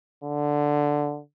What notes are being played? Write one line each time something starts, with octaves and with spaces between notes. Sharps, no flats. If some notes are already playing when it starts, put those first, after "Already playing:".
D3